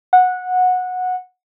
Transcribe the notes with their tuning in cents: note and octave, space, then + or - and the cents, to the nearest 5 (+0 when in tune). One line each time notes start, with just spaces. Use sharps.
F#5 -15